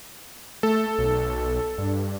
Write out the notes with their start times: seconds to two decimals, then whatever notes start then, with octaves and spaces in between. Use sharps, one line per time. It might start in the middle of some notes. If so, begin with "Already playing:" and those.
0.63 A3 A4
0.99 B1
1.78 G2